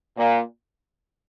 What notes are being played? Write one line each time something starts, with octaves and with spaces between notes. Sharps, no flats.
A#2